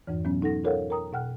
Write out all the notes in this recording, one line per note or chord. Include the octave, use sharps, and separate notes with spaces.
F2 G#2 E3
B2 F#3 B3 C#4
D#4 A4 F#5 A#6
F4 A4 A#4 C#5 F5 F#5
A#4 G5 A#5 D#6
B2 F#5 G5 F6 F#6